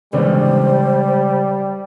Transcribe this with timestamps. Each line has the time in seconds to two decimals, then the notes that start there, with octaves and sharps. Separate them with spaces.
0.13 A1 D2 C#3 G3 G#3 B3 C5